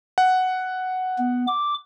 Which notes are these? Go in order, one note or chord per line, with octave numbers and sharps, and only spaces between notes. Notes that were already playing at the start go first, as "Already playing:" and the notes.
F#5
B3
D6